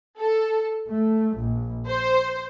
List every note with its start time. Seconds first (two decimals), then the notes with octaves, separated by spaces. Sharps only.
0.19 A4
0.89 A3
1.38 A#1
1.89 C5